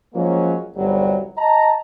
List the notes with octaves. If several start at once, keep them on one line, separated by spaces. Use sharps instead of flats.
F3 F#3 G#3 A#3 C#4
G1 C2 F#3 G3
D#5 A5 A#5